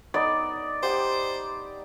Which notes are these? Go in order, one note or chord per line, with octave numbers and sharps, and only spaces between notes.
B3 D#4 D5 D#5
G4 C5 F#5